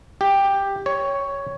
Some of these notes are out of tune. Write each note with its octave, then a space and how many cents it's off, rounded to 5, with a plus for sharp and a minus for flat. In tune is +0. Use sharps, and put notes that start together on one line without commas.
G4 +10
C#5 +5